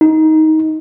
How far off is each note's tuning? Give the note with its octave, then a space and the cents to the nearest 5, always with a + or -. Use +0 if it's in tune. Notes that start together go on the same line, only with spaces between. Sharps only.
D#4 +15